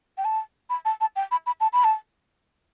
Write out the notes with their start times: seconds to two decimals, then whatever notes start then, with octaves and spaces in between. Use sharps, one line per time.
0.18 G5
0.25 A5
0.70 B5
0.85 A5
1.01 A5
1.16 G5
1.31 B5
1.46 B5
1.61 A5
1.73 B5
1.84 A5